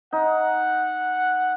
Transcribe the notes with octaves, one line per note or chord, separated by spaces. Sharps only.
D#4 F#5